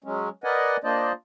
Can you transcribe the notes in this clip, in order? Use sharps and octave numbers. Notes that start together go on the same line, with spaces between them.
F#3 G#3 C#4
A#4 B4 D5 D#5 F#5 G#5
A#3 D4 F4 C5 D5 D#5